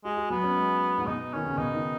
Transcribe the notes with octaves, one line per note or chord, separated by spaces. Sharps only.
G#3 F#4
F#4
F#3 B3
C#4
G#3
G#2
B2 D#4
D#3 C#4
C#3
B2 D#4
D#3